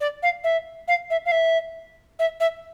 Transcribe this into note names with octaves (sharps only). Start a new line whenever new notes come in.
D5
F5
E5
F5
E5
F5
E5
E5
E5